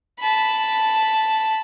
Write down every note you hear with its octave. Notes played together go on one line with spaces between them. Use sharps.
A5 B5